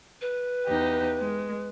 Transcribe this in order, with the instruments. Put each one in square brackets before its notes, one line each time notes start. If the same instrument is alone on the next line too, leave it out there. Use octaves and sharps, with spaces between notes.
[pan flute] B4
[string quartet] E2 D#4 G4
G#3